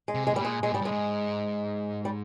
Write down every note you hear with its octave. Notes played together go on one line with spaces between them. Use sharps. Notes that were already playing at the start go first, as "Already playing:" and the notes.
G#3
C3
G#3
G#2
A#2 G3
G#3
A#2 G#3
G#2 G3
G2 G#3
G#2
G3